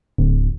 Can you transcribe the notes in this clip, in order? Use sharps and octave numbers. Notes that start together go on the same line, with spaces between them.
D1